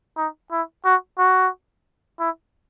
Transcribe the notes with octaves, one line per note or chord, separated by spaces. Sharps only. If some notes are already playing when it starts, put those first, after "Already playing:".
D#4
E4
F#4
F#4
E4